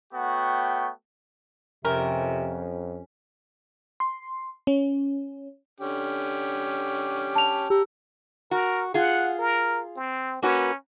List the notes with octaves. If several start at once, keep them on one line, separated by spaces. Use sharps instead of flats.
A3 B3 F#4 C#5 G5
F2 C3 C#4 G4 A#4
C6
C#4
D3 C#4 G4
A5 F7
G4 A#5 E6
F#4 A#4
F4 G#4 F#5
A#4
C4
A#3 C#4 F#4 B4